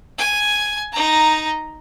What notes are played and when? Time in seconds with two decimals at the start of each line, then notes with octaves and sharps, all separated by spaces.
0.18 G#5
0.92 D#4 A#5